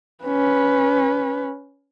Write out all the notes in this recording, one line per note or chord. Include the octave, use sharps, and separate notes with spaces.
C#4 B4